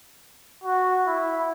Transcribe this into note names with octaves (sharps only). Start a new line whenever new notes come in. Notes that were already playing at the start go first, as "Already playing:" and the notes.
F#4
E4